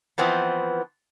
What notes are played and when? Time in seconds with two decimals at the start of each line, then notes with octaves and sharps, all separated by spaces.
0.18 E3 F3 B3 C4